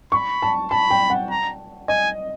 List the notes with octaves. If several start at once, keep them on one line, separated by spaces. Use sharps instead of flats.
B5 C#6
A5
A5 B5
G5
F#5
A#5
D#5 G#5